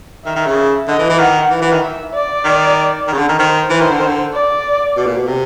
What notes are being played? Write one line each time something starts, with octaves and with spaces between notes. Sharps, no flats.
D#3 E5
D#3
C#3
D3 D#5
E3
E3
D#3 F#5
E3
E3
D#3
E5
D5
D#3
D#3
C#3
D3
D#3
D#3 C5
E3 C5
D#3
D3
D#3
D3
D5
B2
A#2
B2
C3